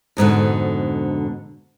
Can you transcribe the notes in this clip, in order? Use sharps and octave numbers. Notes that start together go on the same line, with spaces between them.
F2 G#2 B2 D3